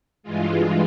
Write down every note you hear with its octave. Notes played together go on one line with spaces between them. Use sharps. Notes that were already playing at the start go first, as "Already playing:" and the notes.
G2 E3 G#3 F4